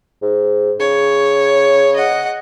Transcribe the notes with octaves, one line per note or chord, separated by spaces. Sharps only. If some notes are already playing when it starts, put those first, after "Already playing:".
G#2
C#3 C#5
D#5 F#5